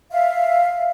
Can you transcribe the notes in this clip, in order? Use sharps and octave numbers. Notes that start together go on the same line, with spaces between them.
E5 F5